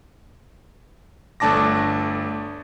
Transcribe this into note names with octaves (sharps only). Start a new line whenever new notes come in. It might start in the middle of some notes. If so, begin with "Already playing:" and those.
G1 A3 D4 A5 D6 A#6